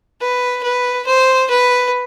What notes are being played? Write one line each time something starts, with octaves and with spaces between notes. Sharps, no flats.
B4
B4
C5
B4